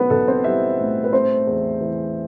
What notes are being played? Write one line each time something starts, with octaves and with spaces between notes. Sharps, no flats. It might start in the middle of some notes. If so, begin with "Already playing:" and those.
Already playing: B1 B3 B4
B1 A4
C4 C5
G3 E4 E5
A2
B4
A3 C4 C5
E2
E3